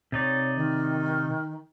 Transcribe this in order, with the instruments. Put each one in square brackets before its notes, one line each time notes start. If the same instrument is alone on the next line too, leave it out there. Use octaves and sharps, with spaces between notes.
[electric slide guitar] C3 D#4 D5 [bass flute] C#5
[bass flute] D#3